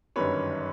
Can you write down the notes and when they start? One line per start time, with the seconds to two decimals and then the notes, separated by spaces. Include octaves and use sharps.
0.16 G1 F#2 D#3 G3 B4 C#5